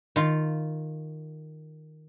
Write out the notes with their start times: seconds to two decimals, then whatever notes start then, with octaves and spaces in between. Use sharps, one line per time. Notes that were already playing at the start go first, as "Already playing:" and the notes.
0.16 D#3 F4